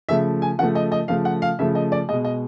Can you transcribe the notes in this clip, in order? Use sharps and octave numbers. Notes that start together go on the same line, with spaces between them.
C#3 F3 A3 E5
G#5
C#3 F3 A3 F#5
D#5
D#5
C#3 F3 A3 F5
F#5
F5
C#3 F3 A3 E5
D#5
D5
B2 G#3 D#5
D#5